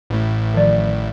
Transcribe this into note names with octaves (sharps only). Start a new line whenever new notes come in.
A1 A2
D#3 F3 D5